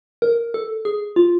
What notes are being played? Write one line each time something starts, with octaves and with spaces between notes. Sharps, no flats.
A#4
A4
G#4
F4